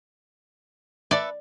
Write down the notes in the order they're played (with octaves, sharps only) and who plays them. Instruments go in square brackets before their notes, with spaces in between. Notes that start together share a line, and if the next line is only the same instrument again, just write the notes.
[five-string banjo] A4 B4 E5 [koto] D5